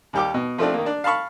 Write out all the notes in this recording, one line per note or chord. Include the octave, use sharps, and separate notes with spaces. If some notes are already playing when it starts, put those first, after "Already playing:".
D#2 G3 G4 G5 D6
B2
F3 A3 C4 D4
D#3 A#3
D4
F5 A5 B5 C#6